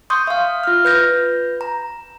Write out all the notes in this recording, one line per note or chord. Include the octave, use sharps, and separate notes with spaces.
C6 C#6 D#6 G6
E5 F5
F4 F6
B4 G6 A#6
A#5